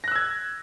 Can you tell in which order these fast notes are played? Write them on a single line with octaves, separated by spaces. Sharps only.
A#6 F#6 E6 G#6